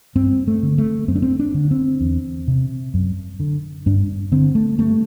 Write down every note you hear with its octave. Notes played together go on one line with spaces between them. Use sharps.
G2 C4
A3
D3
A3
F#2 C4
D4
C4
D4
D3
C4
E2
C3
F#2
D3
G2 D4
D3 C4
A3
G2 A3